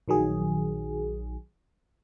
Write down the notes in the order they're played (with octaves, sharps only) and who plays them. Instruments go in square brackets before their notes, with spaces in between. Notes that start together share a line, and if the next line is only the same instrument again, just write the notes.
[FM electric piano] A#1 D#3 F#3 G#4